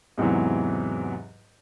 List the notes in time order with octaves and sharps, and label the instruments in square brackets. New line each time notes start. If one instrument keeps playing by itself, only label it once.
[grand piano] E2 G#2 C3 E3 F#3